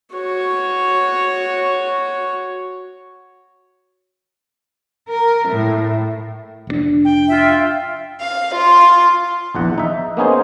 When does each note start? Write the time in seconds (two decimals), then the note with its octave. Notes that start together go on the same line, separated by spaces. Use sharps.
0.15 F#4 C#5
5.08 A#4
5.48 A2
6.67 F1 C3 D4
7.05 G5
7.28 F4 E5
8.21 F5
8.55 F4
9.55 A#1 E2 F#5
9.78 D#4 E5
10.17 A#3 B3 C#4 D#4 G#4 C5